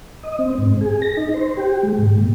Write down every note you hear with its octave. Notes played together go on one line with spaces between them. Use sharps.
D#5
C4
G#2
G#4
A#6
D#4
C5
G4
G#3
G#2
A#2